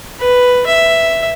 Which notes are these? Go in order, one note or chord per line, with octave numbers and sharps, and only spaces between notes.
B4
E5